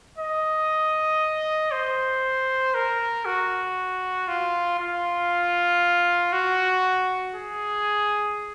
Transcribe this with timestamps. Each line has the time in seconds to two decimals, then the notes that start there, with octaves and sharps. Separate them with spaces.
0.18 D#5
1.72 C5
2.75 A#4
3.25 F#4
4.28 F4
4.79 F4
6.33 F#4
7.35 G#4